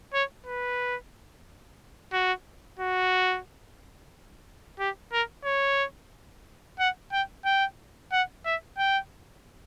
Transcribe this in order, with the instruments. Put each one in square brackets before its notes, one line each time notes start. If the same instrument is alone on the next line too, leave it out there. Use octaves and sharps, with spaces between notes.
[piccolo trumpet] C#5
B4
F#4
F#4
G4
A#4
C#5
F#5
G5
G5
F#5
E5
G5